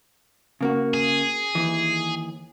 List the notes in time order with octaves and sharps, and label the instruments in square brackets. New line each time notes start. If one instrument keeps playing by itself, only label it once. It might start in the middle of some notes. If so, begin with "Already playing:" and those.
[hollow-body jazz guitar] C#3 A#3 F#4
[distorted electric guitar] G#4
[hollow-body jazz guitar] D#2 E3